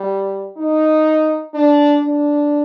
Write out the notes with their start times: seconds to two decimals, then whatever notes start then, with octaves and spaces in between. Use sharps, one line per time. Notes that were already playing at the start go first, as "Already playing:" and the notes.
Already playing: G3
0.57 D#4
1.54 D4
2.03 D4